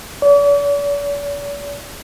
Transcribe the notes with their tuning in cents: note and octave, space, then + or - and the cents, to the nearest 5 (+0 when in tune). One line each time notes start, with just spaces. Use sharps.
D5 -45